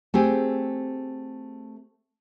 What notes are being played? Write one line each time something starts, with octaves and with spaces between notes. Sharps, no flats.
A3 C4 G4 G#4